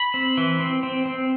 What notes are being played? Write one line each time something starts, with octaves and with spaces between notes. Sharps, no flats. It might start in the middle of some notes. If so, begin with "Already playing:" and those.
Already playing: B5
C4
E3
C4
C4
C4